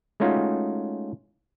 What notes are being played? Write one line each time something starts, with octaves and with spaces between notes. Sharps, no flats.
G#3 A3 C#4 D#4 F4 F#4